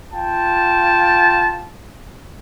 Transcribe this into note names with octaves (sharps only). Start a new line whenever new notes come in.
F4 G5 A5